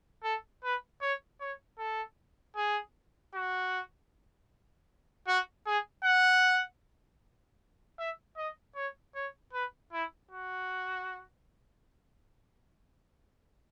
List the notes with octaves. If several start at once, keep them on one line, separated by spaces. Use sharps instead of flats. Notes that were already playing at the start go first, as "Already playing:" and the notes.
A4
B4
C#5
C#5
A4
G#4
F#4
F#4
G#4
F#5
E5
D#5
C#5
C#5
B4
E4
F#4